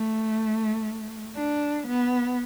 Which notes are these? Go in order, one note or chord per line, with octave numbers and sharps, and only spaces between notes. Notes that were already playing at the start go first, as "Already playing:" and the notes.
Already playing: A3
D4
B3